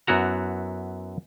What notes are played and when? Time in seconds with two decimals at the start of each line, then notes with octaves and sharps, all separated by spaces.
0.07 F#2 B3 E4 F#4 A#5